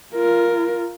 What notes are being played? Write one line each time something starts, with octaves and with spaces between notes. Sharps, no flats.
F4 A#4